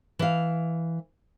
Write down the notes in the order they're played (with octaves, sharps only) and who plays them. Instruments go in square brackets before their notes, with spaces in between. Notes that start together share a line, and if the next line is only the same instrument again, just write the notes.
[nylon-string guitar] E3 F5